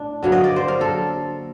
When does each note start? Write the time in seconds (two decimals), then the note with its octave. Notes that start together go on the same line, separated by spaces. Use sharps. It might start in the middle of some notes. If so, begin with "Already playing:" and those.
Already playing: A2 D4
0.22 D3 F#3 A#3
0.32 D#5
0.44 D5
0.56 C5
0.68 A#4
0.81 A4